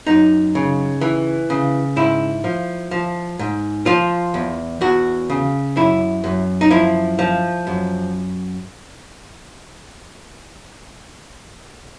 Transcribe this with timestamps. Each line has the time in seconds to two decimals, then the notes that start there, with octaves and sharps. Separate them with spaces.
0.07 F#2 D#4
0.55 C#3
1.01 E3
1.50 C#3
1.96 G#2 E4
2.44 F3
2.91 F3
3.39 G#2
3.86 F3 F4
4.34 E2
4.81 E2 F#4
5.30 C#3
5.76 F#2 E4
6.24 F#2
6.61 D#4
6.71 F3 E4
7.19 F3
7.67 F#2